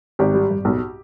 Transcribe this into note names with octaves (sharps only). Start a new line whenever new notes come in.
G#1 G4
G3
G2
B1